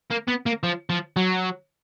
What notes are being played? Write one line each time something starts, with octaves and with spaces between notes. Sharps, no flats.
A#3
B3
A#3
F3
F3
F#3